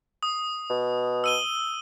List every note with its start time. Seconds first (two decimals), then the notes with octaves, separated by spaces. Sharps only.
0.23 D#6
0.70 B2
1.24 E6 D#7 G7